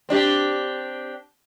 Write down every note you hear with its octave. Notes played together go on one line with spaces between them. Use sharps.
C4 D4 G4